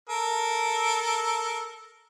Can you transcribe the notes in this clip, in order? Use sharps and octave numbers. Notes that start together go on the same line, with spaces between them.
A4 A#4